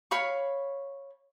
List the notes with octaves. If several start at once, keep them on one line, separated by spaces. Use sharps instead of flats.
C#5 F5 B5 C#6